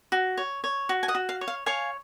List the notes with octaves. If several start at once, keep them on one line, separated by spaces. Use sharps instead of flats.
F#4
C#5
C#5
F#4
G#5
D#5 F#5
F#4
F5
C#5
F5
C#5 F5 G#5